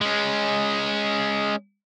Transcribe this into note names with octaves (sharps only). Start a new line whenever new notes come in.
G#3 C#4